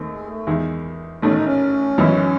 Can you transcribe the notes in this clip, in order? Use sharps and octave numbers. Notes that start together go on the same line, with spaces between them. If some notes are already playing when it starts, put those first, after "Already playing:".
Already playing: D#2 D#3 A3 C4
G#3
A3
E2 D#3 G#3
A1 G#2 D#3 A3 C#4
D#4
C#4
G#1 F#2 E3